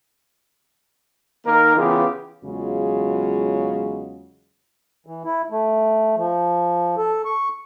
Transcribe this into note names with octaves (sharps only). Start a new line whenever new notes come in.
D#3 A#3 D#4 A#4
C#3 E3 B3 F4 G4 G#4
E2 C#3 F#3 G#3 F4 F#4
E3
E4
A3
F3
A4
C#6